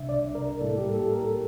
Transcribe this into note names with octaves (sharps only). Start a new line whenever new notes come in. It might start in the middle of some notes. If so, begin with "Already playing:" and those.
Already playing: C2 C3 G3 D4 E5
D5
A#4
A2 G3 A#3 E4 A4
G4
A4
A#4